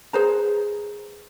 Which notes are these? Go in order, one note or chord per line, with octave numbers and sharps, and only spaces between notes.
G#4 B4 C5 A#5